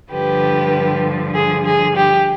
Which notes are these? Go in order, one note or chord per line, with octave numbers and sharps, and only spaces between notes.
G2 D3 F3 G4 B4
G#4
G#4
G4